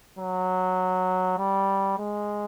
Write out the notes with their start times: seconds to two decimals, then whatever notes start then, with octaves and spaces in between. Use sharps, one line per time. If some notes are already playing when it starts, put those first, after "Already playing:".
0.19 F#3
1.38 G3
1.98 G#3